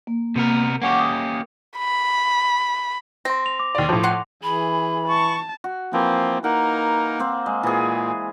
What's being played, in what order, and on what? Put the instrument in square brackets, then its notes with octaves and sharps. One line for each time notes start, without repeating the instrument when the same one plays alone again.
[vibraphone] A#3
[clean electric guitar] C3 B3 A#4
[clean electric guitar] A#3 C#4 G4 [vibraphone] F#5 C#6 D6
[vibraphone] D#6
[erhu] B5
[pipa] C4 [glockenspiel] C6 A#6
[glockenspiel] F7
D6
[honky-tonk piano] D#2 D5
A2 F3
[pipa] F#5 C6
[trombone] E3 [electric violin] G#4 [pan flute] B5
[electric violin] A5 [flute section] C#6
[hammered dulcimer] F#4
[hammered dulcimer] E3 [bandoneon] F3 A#3 C4
[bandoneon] A#3 D#4 A#4 [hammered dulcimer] F#5
[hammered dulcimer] A#3 C4 C5
G#3
[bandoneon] A#2 [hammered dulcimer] E3 G#4